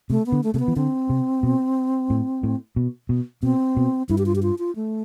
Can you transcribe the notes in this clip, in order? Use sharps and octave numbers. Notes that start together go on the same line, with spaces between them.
C3 A3
B3
D3
A3
C3 A3
B3
E3
D3 C4
C3
B2
A2
A2
B2
B2
B2 C4
B2
G2 E4
G4
F4
G4
F4
F4
A3